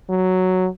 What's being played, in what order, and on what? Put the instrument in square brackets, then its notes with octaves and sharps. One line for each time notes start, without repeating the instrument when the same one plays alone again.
[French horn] F#3